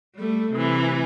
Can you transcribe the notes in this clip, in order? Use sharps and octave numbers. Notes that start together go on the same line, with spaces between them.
G3 A3
C3 E3